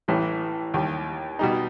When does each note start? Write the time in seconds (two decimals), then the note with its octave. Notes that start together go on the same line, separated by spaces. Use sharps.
0.08 A1 A2 E3 G3
0.74 D#2 D#3 G3
1.39 B2 G3 D#4